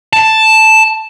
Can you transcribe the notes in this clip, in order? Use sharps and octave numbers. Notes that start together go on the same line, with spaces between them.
A5